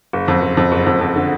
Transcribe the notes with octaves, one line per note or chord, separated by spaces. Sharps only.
F#1
F2
F#1
F2
F#1
F2
F2
D3